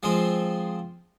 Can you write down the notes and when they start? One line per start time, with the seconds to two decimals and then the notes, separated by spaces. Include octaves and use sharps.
0.03 F3 G#3 C4